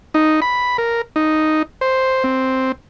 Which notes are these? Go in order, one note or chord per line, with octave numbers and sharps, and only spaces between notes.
D#4
B5
A#4
D#4
C5
C4